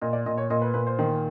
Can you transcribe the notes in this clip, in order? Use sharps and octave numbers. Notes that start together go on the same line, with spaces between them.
A#2 D#5
D5
A#2 D#5
C#5
A#2 D#5
B4
A#2 B4
C5
D#3